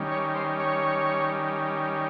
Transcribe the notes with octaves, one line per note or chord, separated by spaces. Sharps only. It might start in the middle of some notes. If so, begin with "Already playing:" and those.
Already playing: D#3 G3 C#4
C#5
C5
C#5